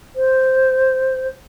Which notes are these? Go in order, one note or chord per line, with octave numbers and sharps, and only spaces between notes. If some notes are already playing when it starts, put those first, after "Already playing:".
C5